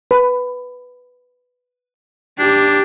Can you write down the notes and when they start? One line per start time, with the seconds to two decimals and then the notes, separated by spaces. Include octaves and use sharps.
0.11 B4
2.39 D4 G4